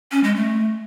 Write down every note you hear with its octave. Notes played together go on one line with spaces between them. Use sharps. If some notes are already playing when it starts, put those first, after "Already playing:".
C#4
G#3
A3